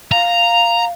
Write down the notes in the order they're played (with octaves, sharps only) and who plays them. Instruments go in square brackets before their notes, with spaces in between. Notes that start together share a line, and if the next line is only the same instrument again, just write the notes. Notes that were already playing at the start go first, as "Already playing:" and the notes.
[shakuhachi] F5 [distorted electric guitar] A#5